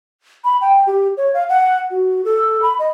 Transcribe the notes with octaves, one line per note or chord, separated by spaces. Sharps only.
B5
G5
G4
C#5
F5
F#5
F#4
A4
B5
D#5